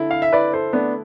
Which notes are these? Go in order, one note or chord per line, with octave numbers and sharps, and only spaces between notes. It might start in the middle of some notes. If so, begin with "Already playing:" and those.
Already playing: D3 E4
F5
E5
E4 B4 D5
A4 C5
A3 B3 D4